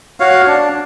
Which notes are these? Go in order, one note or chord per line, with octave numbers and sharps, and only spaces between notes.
F#4 C#5 F5
D4